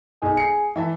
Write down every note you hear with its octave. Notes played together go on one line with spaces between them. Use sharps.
B1 D#4 G#4
C7 C#7
E3 E5 A5